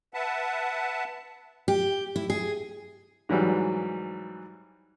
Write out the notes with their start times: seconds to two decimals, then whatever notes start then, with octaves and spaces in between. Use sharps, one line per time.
0.14 B4 E5 F#5 A5
1.68 G4
2.16 E4
2.30 G#4
3.29 G#2 E3 F#3 G3